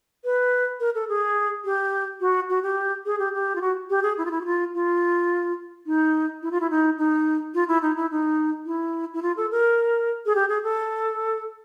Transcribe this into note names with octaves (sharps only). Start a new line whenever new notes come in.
B4
A#4
A4
G#4
G4
F#4
F#4
G4
G#4
G4
G4
F4
F#4
G4
G#4
E4
F4
E4
F#4
F4
F4
D#4
E4
F4
E4
D#4
D#4
F4
E4
D#4
E4
D#4
E4
E4
F4
A4
A#4
G#4
G4
G#4
A4